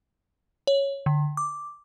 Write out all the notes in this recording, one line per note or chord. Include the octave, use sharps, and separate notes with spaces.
C#5
D3
D6